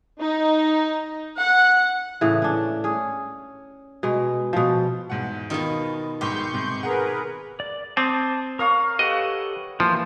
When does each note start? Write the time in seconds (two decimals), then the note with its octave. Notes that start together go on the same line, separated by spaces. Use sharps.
0.21 D#4
1.38 F#5
2.21 A2 C#3 E3
2.42 C#4 D4
2.84 C#4 G#4
4.03 B2 G#3
4.53 B2 F3
5.10 E2 G#2 F#5
5.50 B2 D#3 D#4 F4
6.21 A#1 G#2 G4 C6 C#6 G6
6.52 G#2 C3
6.83 G#4 A#4 B4 F#5
7.60 D5
7.97 C4 A5 D6 D#6
8.59 A#4 C#5 F5 D#6
8.99 G4 A4 B4 D#5 F#5
9.80 E3 F3 A#3